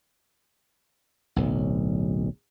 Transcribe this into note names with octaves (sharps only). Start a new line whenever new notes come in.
D1 B1